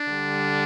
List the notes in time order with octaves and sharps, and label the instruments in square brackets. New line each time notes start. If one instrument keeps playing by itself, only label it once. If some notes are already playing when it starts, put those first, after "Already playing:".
Already playing: [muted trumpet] D4
[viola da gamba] D3 G3